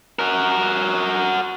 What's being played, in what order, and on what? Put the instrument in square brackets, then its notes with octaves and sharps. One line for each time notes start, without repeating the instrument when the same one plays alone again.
[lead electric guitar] F#4 A#4